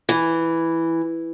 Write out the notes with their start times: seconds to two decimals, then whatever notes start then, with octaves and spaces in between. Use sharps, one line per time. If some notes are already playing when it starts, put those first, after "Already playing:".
0.09 E3